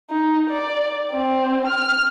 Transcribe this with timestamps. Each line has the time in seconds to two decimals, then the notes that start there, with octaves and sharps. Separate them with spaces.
0.10 D#4
0.50 D5
1.13 C4
1.67 F6